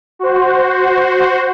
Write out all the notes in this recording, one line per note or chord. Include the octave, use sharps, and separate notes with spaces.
F#4 C5